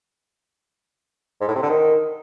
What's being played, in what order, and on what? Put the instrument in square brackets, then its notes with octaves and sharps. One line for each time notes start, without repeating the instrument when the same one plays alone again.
[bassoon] G#2
A2
C3
D3
D#3